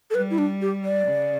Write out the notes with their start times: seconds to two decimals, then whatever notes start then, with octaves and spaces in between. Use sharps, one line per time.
0.10 A4
0.15 G3 B4
0.31 E4
0.38 D4
0.61 G4
0.84 D5
1.07 C#3